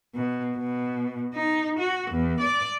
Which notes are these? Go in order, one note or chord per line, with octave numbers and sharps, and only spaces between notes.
B2
B2
D#4
F#4
E2
D5